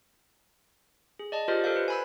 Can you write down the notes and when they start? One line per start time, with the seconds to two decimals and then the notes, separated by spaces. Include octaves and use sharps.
1.19 G#4
1.32 D5 D#5 A5
1.48 F4 G4 A#4 C5 D5 D#5
1.64 A4 A#4 C5 F5
1.76 B4
1.88 G#5 B5 E6